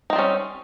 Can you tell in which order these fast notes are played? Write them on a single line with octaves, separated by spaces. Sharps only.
D#4 C4 G3 C#4